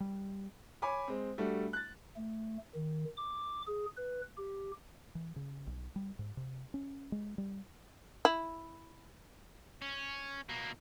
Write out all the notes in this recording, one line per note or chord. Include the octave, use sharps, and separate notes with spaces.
G3
C#5 G#5 B5 D6
G#3 C4
G3 A3 D4 F#4 A4
F#6 A6
A3
D#3
D6
G#4
B4
G4
E3
C#3
B1
G3
G#2
C3
C#4
G#3
G3
E4
C#4
B2 A#3